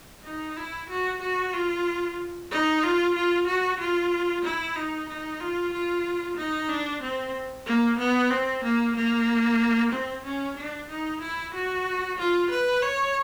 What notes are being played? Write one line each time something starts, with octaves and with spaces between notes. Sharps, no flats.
D#4
E4
F#4
F#4
F4
D#4
F4
F4
F#4
F4
E4
D#4
D#4
F4
F4
D#4
D4
C4
A#3
B3
C4
A#3
A#3
C4
C#4
D4
D#4
E4
F#4
F4
B4
C#5